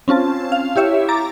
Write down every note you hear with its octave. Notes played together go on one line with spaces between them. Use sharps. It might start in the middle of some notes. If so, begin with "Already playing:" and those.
C4 C#4 F4 A5
F5
E4 G4 C#5 E5
A#5 D6 A6